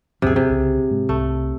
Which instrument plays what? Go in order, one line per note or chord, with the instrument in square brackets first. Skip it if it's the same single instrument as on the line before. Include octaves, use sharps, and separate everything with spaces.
[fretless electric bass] D2 G2 F3 [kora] C3 G#4
[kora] C3
[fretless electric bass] C2 C#3
G#2 G#3
[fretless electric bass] C2 [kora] A3